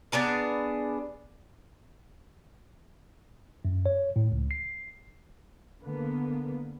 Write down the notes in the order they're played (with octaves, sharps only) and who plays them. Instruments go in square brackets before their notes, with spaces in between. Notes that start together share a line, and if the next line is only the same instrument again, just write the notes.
[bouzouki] B3 D4 G#4 A#5
[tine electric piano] F#2
C#5
A2
C#2
C7
[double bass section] D3 A#3 B3